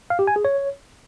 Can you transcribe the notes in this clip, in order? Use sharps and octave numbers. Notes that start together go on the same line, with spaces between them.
F5
G4
G#5
G#4
C#5